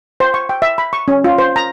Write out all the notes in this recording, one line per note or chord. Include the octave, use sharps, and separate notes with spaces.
C5
C#6
G5
E5
B5
C#6
C#4
F4
C5
A#5